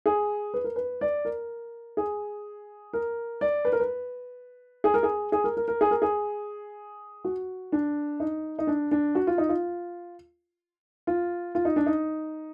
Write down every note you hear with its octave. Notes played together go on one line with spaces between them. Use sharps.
G#4
B4
A#4
B4
D5
A#4
G#4
A#4
D5
B4
A#4
B4
G#4
A#4
G#4
G#4
A#4
A#4
A#4
G#4
A#4
G#4
F#4
D4
D#4
D#4
D4
D4
F#4
F4
D#4
F4
F4
F4
D#4
D4
D#4